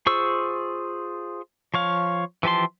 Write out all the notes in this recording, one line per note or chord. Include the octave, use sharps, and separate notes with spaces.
F4 G#4 C5 C#6 E6
F3 C#5 F5
E3 F3 G4 A5 C6